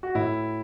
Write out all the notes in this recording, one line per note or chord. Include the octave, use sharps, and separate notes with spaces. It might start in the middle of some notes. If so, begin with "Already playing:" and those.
F#4
A2 E4